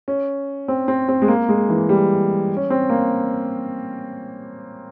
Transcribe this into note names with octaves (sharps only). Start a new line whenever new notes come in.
C#4
C4
C4
C4
G#3
A#3
G#3
E3
G3
C#4
C4
A#3